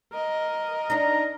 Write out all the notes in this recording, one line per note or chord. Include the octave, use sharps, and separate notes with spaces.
A#4 D#5
D4 D#4 A#5